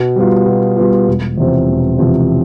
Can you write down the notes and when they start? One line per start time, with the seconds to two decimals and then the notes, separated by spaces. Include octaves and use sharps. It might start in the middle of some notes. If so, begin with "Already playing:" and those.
Already playing: B2
0.16 G3 B3 F4
0.46 B2
0.77 G3 B3 F4
1.07 E1
1.38 E2 C3 F3 C4
1.68 E1
1.99 E2 C3 F3 C4